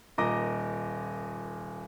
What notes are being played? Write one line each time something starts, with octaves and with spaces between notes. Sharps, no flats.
D#1 A#2 D#5 A#5 D6 A#6